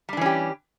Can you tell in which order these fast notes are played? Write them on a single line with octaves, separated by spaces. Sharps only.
G3 D4 E3 C#4 G4